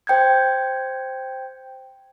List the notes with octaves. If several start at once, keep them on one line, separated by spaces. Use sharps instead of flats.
C5 G5 G6 G#6